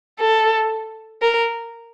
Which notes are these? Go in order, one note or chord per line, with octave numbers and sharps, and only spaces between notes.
A4
A#4